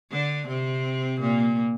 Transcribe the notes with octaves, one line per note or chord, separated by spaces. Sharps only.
D3 D4
C3 C4
A#2 A#3